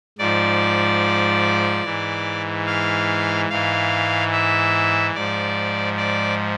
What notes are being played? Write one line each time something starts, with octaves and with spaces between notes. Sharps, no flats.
G#2 F3 D5
G#2 E3
F5
G#2 E3 F5
E5
G#2 F3 D5
D5